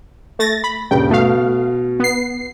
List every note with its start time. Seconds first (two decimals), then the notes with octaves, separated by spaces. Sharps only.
0.39 A3 A6 A#6
0.64 B5
0.91 D#1 G2 C#3 G5
1.11 B2 A3 F5
2.00 B3 C7